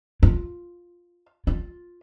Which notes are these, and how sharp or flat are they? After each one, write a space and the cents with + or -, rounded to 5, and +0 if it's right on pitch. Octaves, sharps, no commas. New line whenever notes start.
F4 +0
F4 +10